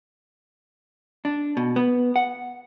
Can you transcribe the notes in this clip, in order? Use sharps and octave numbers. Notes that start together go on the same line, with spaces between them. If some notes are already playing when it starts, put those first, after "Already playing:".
D4
B2
B3
F#5